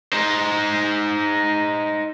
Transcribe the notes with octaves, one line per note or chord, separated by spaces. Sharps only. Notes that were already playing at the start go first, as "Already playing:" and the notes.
D#4 C5